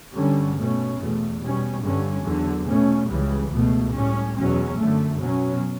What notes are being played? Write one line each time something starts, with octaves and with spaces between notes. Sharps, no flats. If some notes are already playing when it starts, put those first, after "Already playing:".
G2 D3 G3 C#4
B2 A3 C#4
E2 B2 A3
B2 G3 C#4
G2 D3 G3 C#4
E2 D3 F#3
B2 A3 C#4
C#2 C#3 E3 G3
C#2 B2 A3
A2 G3 C#4
E2 B2 F#3 C#4
F#2 D3 A3
B2 F#3 C#4